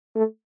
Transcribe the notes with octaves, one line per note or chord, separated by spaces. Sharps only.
A3